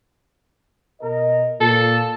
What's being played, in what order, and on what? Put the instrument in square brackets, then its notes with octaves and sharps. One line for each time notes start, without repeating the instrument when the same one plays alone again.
[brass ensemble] B2 A#4 D#5
[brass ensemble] A#2 [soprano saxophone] A4